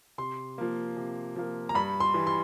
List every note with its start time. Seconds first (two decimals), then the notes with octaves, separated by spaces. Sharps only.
0.18 C3 C6
0.58 F3 A#3
0.97 C3
1.36 F3 A#3
1.69 A#5
1.74 G2 B5
2.00 C6
2.14 E3 G3
2.27 C6